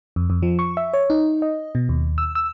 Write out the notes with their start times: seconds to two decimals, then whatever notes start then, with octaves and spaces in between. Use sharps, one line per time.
0.16 F2
0.30 F2
0.43 F3
0.59 C#6
0.77 E5
0.94 C#5
1.10 D#4
1.42 D#5
1.75 B2
1.89 D#2
2.18 E6
2.35 E6